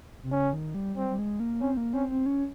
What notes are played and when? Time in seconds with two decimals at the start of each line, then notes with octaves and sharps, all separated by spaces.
0.23 C3
0.32 C#3 C#4
0.53 D#3
0.74 G3
0.96 G3 C4
1.10 G3
1.18 G#3
1.40 A#3
1.61 C4 C#4
1.77 A#3
1.93 C4 C#4
2.10 C4
2.26 C#4